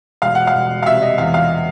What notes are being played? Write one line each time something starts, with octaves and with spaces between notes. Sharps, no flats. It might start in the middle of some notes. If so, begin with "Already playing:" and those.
E1 F5
F#5
F5
E1
F5
C3 E5
D#5
E2 F5
F5